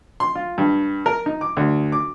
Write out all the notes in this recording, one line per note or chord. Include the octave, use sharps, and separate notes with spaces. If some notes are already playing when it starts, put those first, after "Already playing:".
C6
F4
G2
A#4
D#4
D6
D2
D6